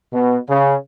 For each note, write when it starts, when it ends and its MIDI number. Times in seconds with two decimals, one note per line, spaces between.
0.13 0.38 47
0.48 0.75 49